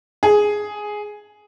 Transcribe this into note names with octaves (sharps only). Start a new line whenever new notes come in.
G#4